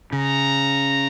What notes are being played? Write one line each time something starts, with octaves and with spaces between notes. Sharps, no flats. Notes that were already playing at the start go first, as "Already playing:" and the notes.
C#3 A#5